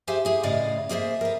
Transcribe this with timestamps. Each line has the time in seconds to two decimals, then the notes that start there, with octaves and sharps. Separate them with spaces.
0.07 G4 G#4 C5 E5 F5 G#5
0.25 E4 G#4
0.43 A2 C#3 D5 D#5 F5
0.89 A#3 G#4 C5 E5
1.21 A#4 B4